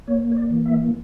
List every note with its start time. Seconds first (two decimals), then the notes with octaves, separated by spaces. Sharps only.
0.07 A#3 C#5
0.32 C#5
0.36 D5
0.51 E3
0.66 E5